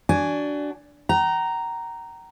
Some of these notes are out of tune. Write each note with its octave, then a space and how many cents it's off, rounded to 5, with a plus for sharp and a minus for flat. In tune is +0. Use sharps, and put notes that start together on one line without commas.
D4 -10 F#4 +25 G#5 +0
G5 -45 A#5 +0